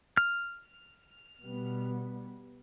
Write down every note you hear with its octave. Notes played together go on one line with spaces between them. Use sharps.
F6
B2 G3 B3